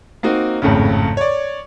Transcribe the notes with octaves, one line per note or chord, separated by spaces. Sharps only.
A#3 C4 D#4 F#4
G#1 F2 A2 C#3
C#5 D5